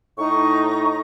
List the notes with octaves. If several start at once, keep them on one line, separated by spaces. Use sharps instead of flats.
A2 D#4 A#5 C#6